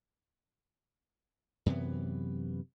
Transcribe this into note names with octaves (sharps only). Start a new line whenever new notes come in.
F#2 C3 E3 B3